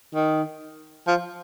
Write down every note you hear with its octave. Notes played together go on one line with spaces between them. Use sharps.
D#3
F3